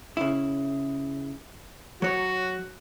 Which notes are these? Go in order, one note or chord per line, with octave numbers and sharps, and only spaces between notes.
C#3 E4
F#3 F#4 C#5